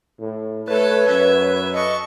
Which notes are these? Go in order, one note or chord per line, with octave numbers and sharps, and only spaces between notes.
A2
A3 A4 B4 C#5 A5
F#2 E5
A4 D#5 C#6